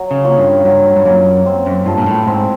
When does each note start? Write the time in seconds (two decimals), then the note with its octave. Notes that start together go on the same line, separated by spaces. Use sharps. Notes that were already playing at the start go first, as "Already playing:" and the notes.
Already playing: F#3
0.11 C#3
0.24 A#3 C#4 F4
0.38 G2
0.65 G2 F#3
0.96 G2
1.05 F#2 A#3 C#4 F4
1.46 C4
1.66 F#2
1.86 G2 F4 A4
1.98 A#2
2.06 A2
2.27 G#2 C4